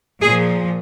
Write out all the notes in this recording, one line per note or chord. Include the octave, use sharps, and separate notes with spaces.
A#2 F3 G#4